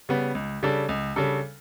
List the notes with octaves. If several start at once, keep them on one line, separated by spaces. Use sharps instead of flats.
C#3 G3 B3
C#2
C#3 G3 D4 A4
C#2
C#3 G3 D4 A4